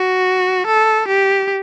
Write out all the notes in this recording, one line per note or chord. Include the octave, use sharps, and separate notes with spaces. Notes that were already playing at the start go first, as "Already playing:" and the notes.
Already playing: F#4
A4
G4